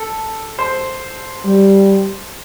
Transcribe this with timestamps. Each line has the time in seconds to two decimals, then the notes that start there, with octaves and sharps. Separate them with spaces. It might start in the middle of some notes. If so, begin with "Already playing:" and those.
Already playing: A4
0.59 C5
1.45 G3